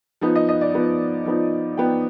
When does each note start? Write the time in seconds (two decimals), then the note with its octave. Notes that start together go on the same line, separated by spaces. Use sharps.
0.21 F3 B3 D#4
0.35 D#5
0.49 D#5
0.61 D5
0.74 F3 B3 D#4
1.26 F3 B3 D#4
1.77 F3 B3 D#4 G5